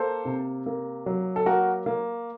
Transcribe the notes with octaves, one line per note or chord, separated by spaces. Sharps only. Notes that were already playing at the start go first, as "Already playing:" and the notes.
Already playing: A#3 A4 C5
C3
A#3
F#3
A4
A#3 F#4 A#4
A#3